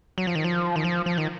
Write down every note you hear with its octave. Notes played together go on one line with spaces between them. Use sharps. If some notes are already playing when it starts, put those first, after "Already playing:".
F#3
F3
D#3
F3
D#3
F3
F3
D#3